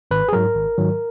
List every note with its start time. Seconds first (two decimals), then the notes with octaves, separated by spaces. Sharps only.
0.11 G#1 B4
0.28 G#4
0.33 G#2 F#3 A#4
0.55 G#1
0.78 G#2 D#3 F#3